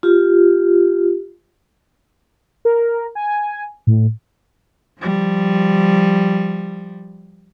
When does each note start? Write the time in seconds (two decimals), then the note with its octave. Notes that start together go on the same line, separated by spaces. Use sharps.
0.03 F4 G4
2.65 A#4
3.15 G#5
3.87 A2
5.00 F3 G3